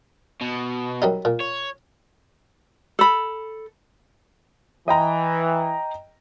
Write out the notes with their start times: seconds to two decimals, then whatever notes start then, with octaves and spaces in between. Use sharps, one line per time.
0.41 B2
1.02 F#2 G3 D#4
1.25 A#2
1.40 C#5
2.99 A4 B5
4.88 E3 D#5 G5 A#5